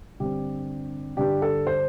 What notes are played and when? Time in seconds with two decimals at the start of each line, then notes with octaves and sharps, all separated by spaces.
0.19 G2 D3 G3 C4 G4
1.17 G2 D3 G3 D4 G4
1.42 A4
1.67 C5